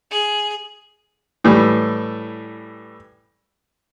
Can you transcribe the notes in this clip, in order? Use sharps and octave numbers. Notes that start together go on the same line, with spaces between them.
G#4
A2 E3 G3